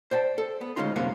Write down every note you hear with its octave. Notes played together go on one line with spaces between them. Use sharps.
C5 D5 G5 A5
A4
B3
D2 G#3 C#4 D#4 F4 C6
C2 F#2 C3 A#3 C#4 F#5